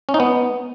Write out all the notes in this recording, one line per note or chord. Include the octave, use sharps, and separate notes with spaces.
C#4
D#4
B3